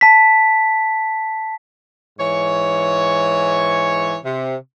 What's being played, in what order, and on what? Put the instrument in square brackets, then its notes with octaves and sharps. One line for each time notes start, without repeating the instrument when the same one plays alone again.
[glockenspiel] A5 B6
[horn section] G#2 E3 C#5
C3